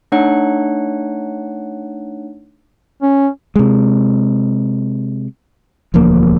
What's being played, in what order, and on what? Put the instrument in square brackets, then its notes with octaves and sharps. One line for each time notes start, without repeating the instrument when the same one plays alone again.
[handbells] A3 D4 D#4 C#5 F#5 F#6
[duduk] C#4
[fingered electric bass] C3 G#3
E1 D2 F3 A#3